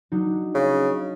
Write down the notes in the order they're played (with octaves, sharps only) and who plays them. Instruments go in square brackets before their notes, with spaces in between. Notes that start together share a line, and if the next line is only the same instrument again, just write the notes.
[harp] F#3 D4 D#4
[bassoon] C#3